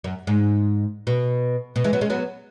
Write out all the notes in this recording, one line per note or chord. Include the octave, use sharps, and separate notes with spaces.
F#2
G#2
B2
B2
E3 G#3
F#3 B3
G#3 C#4
F#3 B3